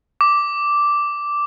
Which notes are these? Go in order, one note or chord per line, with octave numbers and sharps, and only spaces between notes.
D6